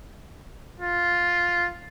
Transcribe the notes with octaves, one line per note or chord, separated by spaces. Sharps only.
F4